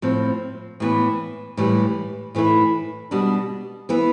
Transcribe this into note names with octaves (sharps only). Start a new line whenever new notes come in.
A2 F3 C4
A2 E3 B3
A2 E3 G3
A2 E3 A3 E4
B2 G3 D4
E3 B3 E4